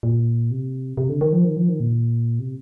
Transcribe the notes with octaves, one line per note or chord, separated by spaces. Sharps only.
A#2
C3
C3
D3
D#3
F3
D#3
F3
D#3
A#2
C3